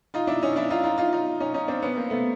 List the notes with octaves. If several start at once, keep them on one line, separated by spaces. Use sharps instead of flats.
D#4 F4
D4 E4
C#4 D#4
D4 E4
D#4 F4
D#4 F4
D#4 F4
D#4 F4
C#4 D#4
C#4 D#4
C4 D4
B3 C#4
A#3 C4
A3 B3